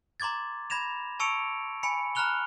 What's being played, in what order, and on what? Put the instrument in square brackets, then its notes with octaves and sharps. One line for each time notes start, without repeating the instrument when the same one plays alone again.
[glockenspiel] A#5 C6 D6 G#6 A6
B5 G#6 A#6 E7 F7
A5 C#6 E6 C#7 D7 F7
G#5 B5 C#7
A#5 B5 F6 F#6 F7 G7